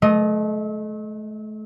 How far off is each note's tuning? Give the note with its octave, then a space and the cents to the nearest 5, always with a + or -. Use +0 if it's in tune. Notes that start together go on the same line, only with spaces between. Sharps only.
A3 -35 D#5 +0